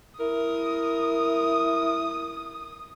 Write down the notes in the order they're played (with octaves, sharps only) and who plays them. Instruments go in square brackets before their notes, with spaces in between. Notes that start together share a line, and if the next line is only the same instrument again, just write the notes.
[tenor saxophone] E4 [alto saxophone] A#4 [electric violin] D#6